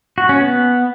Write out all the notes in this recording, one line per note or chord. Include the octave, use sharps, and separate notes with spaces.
F#4
C#4
B3